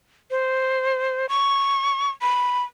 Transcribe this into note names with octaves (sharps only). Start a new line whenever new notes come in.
C5
C#6
B5